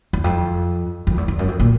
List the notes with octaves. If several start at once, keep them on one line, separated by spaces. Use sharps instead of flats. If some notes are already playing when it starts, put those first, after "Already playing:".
E2
F2
F2
E2
F2
F#2
F2
A#2